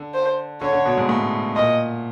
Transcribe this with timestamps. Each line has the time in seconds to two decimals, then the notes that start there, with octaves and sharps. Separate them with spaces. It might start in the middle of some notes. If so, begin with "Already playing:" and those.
Already playing: D3
0.14 C5
0.61 D3 C#5
0.73 D3
0.86 B2
0.97 G#2
1.09 A2
1.56 A#2 D#5